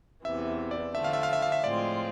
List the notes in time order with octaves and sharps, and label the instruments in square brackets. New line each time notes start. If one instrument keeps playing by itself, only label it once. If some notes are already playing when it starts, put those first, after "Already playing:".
[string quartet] E2 C3 E3 [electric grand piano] E5
[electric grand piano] D5
[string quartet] D3 F3 A3 [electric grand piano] E5
[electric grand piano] F5
E5
F5
E5
F5
E5
[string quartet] A2 F3 G#3 C4 F4 [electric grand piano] D5